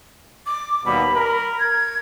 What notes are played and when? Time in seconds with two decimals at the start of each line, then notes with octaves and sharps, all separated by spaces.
0.46 D6
0.86 D#2 B2 G3 B5
1.15 A#4
1.60 G#6